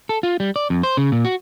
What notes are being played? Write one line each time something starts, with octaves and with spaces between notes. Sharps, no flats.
A4
F4
G3
D5
F2
C5
C#3
A#2
F#4